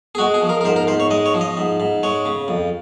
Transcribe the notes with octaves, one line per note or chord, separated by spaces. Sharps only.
G#4
G#3 F#4
G#4
F3
A#4
A#4
G#2 C5
A#4
G#2 C5
C#5
G#3 D#5
C#5
F3
D#5
G#2
G#2
G#3 C#5
C#3
F2